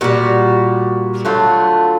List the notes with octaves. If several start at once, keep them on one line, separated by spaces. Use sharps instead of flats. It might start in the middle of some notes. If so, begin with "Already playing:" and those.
A#2 G3 F#4
D3 F#3 A3 F4